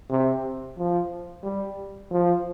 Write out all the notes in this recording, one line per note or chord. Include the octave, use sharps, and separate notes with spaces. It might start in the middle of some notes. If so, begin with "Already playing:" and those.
C3
F3
G3
F3